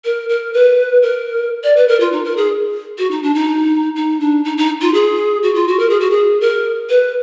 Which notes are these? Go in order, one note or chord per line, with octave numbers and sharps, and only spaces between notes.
A#4
A#4
B4
A#4
D5
B4
A#4
F4
D#4
A#4
G#4
F#4
D#4
D4
D#4
D#4
D4
D#4
D#4
F4
G#4
F#4
F4
F#4
A#4
G#4
F#4
G#4
A#4
B4